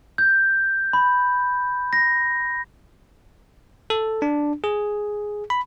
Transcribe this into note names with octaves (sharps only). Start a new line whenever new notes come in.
G6
B5
A#6
A4
D4
G#4
B5